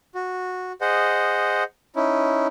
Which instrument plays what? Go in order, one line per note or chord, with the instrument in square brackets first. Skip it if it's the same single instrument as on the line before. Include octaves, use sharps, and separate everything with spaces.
[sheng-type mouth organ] F#4
G#4 C5 D#5 F#5
C#4 D#4 E4